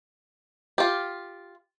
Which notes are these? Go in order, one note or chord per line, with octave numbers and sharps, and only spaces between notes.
F4 G4